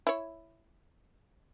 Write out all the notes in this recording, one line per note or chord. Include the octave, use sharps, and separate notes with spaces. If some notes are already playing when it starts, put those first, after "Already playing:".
E4 C#5